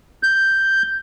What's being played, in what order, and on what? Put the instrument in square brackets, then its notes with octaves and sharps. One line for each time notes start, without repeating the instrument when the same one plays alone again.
[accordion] G6